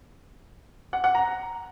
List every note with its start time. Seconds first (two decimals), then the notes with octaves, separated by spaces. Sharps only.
0.93 F#5
1.04 F#5
1.15 A#5